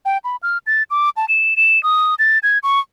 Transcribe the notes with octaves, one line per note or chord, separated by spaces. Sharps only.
G5
B5
F6
A6
D6
A5
E7
E7
D#6
A6
G#6
C#6